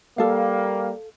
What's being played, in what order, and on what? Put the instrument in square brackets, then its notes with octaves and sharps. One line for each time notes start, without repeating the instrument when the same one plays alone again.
[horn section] G3 A#3 [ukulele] A4 F5